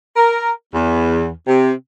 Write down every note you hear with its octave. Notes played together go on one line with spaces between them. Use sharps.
A#4
E2
C3